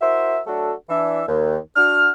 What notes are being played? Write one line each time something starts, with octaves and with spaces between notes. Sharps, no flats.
E4 F#4 A#4 C5 E5
F#3 A3 D4 F#4 A4
E3 D4 E5
D#2
D4 F#4 F6